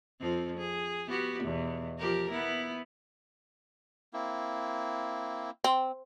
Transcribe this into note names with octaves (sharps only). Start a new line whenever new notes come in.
F2 F3 C4
G#4
B3 F#4 G4
E2 B2
F3 G4 A#4
B3 E4
A#3 C4 E4
C4